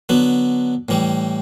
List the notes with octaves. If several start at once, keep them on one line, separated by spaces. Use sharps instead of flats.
D3 F#3 B3
A2 E3 G3